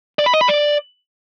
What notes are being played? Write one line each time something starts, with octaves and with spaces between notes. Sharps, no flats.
D5
B5
D#5
B5
D5